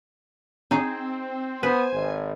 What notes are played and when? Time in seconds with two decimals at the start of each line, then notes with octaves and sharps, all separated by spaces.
0.71 C4 D#4 G#4
1.63 B3 B4 C5 G#5
1.93 G#1